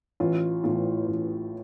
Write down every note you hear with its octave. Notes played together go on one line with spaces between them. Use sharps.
A1 F4
A2 E3 F4
A1